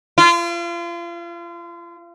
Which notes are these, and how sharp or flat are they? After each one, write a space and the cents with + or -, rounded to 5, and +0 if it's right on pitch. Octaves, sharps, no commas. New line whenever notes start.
F4 -35